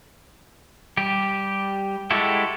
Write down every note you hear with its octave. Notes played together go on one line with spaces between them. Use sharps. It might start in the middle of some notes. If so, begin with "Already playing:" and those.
G3 G4
G#3 E4 F#4 G4 A4